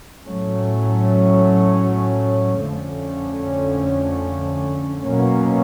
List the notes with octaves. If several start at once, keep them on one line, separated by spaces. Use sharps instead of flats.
A2 F#3 A3 C#4
F2 D3 F3 A3 C#4
B2 F#3 A#3 C#4